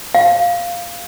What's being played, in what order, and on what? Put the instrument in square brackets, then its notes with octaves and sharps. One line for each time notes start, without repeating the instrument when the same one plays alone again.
[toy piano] F5